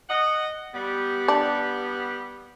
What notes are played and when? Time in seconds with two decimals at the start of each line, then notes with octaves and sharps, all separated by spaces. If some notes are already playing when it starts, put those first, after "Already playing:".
0.09 D#5 F#5
0.74 G3 B3
1.28 D4